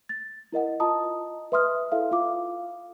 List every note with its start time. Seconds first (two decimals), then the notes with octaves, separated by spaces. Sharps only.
0.09 A6
0.52 E4 A#4 D#5 F#5
0.80 F4 D#5 A5 A#5 D#6
1.52 B4 E5 C6 D#6 F6
1.92 E4 A4 E5 F5
2.11 F4 F5 D6